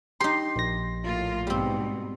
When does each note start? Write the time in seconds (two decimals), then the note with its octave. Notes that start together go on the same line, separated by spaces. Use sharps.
0.21 D#4 G4 C6
0.56 A#1 A#6
1.04 A2 A#3 F4
1.47 G#2 B2 G3 C4